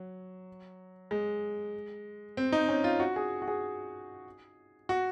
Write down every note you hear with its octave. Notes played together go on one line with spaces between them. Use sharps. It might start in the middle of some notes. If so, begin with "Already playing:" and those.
Already playing: F#3
G#3
C4
D#4
C#4
F4
F#4
G#4
F#4
G#4
F#4